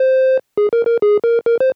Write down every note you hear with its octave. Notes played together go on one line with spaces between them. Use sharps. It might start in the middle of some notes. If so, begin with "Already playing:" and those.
Already playing: C5
G#4
A#4
A#4
G#4
A#4
A#4
C5